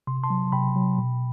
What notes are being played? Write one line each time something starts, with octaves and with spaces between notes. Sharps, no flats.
C3 C6
A5 C6
F#3
C3 G5 B5
F#3
B2